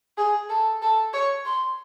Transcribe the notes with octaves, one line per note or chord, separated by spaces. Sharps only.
G#4
A4
A4
C#5
C6